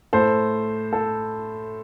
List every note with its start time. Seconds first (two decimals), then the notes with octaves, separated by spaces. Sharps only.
0.13 A2 A4 C5
0.93 A4